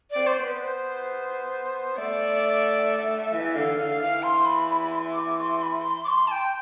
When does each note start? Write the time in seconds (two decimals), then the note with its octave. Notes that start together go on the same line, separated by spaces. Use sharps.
0.11 C4 D5
0.27 C5
0.39 B3 B4
0.61 C5
1.97 A3 D5
3.33 E3 E5
3.55 D3 F5
3.77 D3 F5
4.01 E3 F5
4.23 C6
4.46 B5
4.69 B5
4.81 B5
4.92 C6
5.13 D6
5.36 D6
5.40 C6
5.59 C6
5.63 B5
5.81 C6
6.04 D6
6.09 C6
6.27 A5
6.32 G5